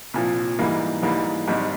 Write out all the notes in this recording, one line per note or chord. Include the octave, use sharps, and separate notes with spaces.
C2 A#2 F3
G#2 E3 G3 A#3
G#2 E3 G3 A#3
G#1 G#2 G3